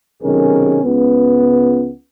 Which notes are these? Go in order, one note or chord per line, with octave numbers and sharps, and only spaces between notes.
B1 C3 D#3 C#4 G#4 A#4
C#2 B3